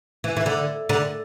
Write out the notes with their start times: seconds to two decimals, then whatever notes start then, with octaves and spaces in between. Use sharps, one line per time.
0.24 E3
0.37 E3
0.46 D3
0.89 D3